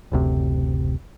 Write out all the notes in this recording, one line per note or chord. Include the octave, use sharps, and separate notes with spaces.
F#1 D2 C3